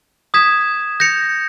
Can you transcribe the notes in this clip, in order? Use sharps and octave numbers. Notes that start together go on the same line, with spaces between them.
D#6 G#6 B6 E7
G6 A#6 C#7 F7